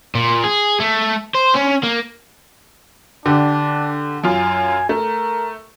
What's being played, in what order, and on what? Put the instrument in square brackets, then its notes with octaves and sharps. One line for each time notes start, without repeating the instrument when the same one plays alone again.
[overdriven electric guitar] A#2
G#4
A3
C5
C#4
A#3
[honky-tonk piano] D3 G4 [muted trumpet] D4
[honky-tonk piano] F#2 F4 [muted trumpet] G#5
[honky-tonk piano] A3 [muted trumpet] A#4